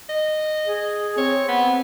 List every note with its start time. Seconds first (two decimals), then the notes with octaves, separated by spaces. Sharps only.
0.09 D#5
0.66 G#4
1.18 C4 C#5
1.48 B3